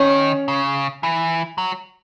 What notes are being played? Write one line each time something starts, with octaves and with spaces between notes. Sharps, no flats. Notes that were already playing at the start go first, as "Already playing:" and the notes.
Already playing: D#3 C#4
C#3
E3
F#3